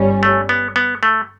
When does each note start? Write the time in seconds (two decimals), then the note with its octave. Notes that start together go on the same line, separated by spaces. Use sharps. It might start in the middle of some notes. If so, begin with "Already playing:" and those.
Already playing: G1 G2 G3 C#4
0.23 A3
0.49 B3
0.76 B3
1.03 A3